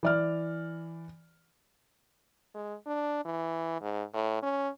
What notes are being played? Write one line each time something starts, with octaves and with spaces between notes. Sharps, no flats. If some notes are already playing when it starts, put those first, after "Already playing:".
E3 D5 F6
G#3
D4
E3
G#2
A2
C#4